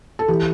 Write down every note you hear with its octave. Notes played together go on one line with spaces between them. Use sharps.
A4
E3 G4